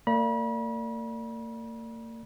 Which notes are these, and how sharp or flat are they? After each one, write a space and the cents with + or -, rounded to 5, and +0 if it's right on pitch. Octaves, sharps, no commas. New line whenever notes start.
A#3 -40 D5 +0 B5 -40